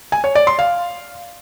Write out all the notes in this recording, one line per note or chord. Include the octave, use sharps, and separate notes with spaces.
G#5
C#5
D5
C6
F5